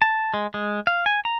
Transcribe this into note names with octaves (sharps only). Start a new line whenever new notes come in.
A5
G#3
G#3
F5
G#5
A#5